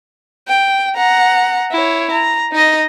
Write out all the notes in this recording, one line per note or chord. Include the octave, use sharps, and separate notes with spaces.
G5
F#5 A#5
E4 C#5
A#5
D#4 D#5